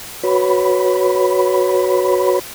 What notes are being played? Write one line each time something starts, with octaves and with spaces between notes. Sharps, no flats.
F#4 B4 C#5 B5